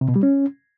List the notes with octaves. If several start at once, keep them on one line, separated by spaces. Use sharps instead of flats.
C3
B2
G3
C#4